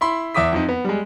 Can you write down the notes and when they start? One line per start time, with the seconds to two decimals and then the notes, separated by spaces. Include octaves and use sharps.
0.01 E4 B5 C6
0.34 E2 E5 D6 D#6 B6
0.53 F2 F3 D#4
0.69 B3
0.85 G3 G#3